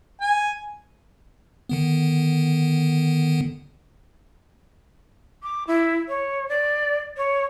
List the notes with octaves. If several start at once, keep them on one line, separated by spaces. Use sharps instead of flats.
G#5
D3 D#3 B3
D6
E4
C#5
D5
C#5